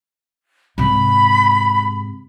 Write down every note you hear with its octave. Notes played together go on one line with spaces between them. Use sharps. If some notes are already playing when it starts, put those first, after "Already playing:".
G#2 C3 B5